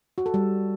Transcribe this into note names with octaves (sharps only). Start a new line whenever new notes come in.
F#4
A4
G3